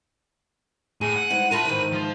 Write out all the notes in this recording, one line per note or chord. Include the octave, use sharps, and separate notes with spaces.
A2 G#4 D#7
F#5
G#2 E3 G3
F4 A#4 E5 A5 B5
G#2 D#3 E3
F3